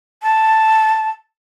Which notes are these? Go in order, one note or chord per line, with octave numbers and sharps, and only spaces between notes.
A5